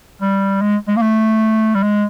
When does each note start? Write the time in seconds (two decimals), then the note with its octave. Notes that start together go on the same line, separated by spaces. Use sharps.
0.22 G3
0.61 G#3
0.88 G#3
0.97 A#3
1.02 A3
1.75 G3
1.83 G#3